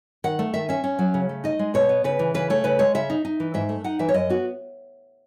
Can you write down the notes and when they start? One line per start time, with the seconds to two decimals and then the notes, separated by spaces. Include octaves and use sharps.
0.24 D#3 F#5
0.39 A3
0.54 D#3 E5
0.69 C#4 E5
0.84 C#4
0.99 F#3
1.14 C#3
1.29 A3
1.44 D#4 D#5
1.59 G#3
1.74 B2 C#5
1.89 B3
2.04 C#3 B4
2.19 E3
2.34 C#3 B4
2.50 A3 C#5
2.64 C#3 B4
2.79 G#3 C#5
2.95 C#3 E5
3.10 D#4
3.25 D#4
3.40 E3
3.54 G#2 E5
3.69 A3
3.84 D#4 F#5
3.99 E3 E5
4.09 C#5
4.14 F#2 D#5
4.30 B3 F#4